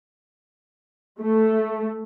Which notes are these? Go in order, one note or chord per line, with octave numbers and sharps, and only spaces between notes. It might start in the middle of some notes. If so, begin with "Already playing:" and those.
A3